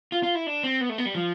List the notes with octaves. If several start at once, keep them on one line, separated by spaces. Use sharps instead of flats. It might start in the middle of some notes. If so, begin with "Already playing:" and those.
F4
F4
E4
D4
C4
B3
A3
B3
G3
F3